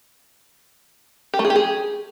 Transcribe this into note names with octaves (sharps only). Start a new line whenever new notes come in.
G4
A3
G#4
G4
G#4